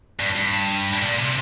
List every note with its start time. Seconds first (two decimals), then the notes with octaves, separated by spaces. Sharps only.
0.20 G2
0.36 G2
1.02 A#2
1.18 C3